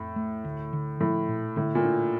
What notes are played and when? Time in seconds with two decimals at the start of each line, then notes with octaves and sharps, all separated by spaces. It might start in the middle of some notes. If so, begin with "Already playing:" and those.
Already playing: F2 A2
0.16 A3
0.45 D2
0.73 D3
1.00 A2 F3
1.29 A#2
1.56 A2 D3
1.75 A#2
1.84 D4